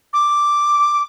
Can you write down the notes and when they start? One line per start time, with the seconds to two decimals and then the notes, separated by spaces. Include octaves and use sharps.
0.13 D6